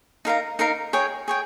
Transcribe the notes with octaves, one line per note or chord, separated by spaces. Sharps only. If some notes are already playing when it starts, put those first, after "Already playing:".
D#4 A#4 F5 A#5
D#4 A#4 F5 A#5
G#4 C#5 G5
G#4 C#5 G5